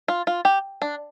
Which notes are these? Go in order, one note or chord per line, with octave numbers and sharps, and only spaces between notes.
F4
F4
G4
D4